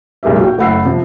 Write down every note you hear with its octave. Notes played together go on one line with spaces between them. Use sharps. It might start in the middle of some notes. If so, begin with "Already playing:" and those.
B1 G#3 A#3 G4 E5
F#4 G5
F#1 A3 E4 F#5 E6 C7
C3 F3